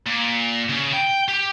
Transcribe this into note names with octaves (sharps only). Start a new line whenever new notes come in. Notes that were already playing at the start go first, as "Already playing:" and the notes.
A#2
C#3
G5
G4